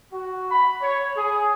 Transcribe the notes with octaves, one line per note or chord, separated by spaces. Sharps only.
F#4
B5
C#5
G#4